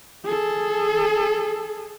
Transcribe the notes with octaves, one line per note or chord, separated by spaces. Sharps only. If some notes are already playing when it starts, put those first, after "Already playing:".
G#4 A4